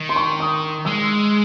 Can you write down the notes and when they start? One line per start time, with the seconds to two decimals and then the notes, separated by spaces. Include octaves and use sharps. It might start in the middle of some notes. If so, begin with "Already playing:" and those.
Already playing: D#3
0.09 C6
0.16 C#6
0.40 D#6
0.85 G#3 E6